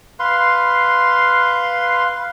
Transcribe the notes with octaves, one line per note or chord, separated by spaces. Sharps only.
B4 F5 C6